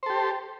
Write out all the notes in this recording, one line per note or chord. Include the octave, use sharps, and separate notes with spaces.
G4 A4 C5